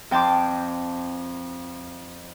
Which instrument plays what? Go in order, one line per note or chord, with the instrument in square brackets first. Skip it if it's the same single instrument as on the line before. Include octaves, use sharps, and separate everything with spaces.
[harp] F2 G5 A5 C6 D6